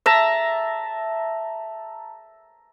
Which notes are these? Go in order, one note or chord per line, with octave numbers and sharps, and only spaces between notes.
E5 A5 A#5